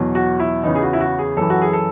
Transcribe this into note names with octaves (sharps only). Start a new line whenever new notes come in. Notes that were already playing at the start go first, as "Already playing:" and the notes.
Already playing: E2 B2 F#3
F#4
E4
E2 C#3 E3 D#4
G#4
F#4
E4
F#4
G#4
F#2 E3 A4
F#4
G#4
A4